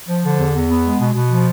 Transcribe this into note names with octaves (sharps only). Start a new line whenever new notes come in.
F3
D3
E2
E2
B3
G#3
B2
B2
F3